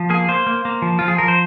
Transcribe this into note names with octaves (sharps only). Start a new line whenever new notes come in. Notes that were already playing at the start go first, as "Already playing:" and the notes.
Already playing: F3
A#3 G#4
A#3 C5
A#3
A#3
F3
F3 F4
G#4
F3 A#4
C5